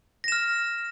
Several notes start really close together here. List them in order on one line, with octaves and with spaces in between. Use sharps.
A#6 E7 F6